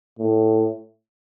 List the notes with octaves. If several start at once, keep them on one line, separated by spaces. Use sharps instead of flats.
A2